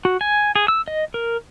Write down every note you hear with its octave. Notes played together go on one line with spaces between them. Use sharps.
F#4
G#5
G#4
E6
D#5
A#4